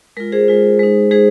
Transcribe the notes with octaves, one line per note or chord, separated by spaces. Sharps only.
G#3 F4 A#4
G#4 C5
G#3 F4
G#3 D#4
G#3 D#4 G#4 C5